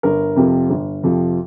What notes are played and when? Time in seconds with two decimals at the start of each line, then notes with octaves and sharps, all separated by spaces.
0.03 G1 A#4
0.36 F2 C3 F3
0.69 G1
1.03 F2 C3 F3